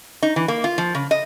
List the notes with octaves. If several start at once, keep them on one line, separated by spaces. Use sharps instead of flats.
D#4
E3
A#3
F4
F3
C#3
D#5